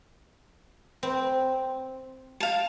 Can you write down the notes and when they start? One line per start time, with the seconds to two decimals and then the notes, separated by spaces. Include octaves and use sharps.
1.03 C4
2.40 F5 A5